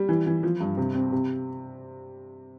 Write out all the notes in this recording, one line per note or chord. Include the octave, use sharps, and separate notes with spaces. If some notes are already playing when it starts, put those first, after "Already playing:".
Already playing: G3
E3
E3
F3
G2
C3
C4
C3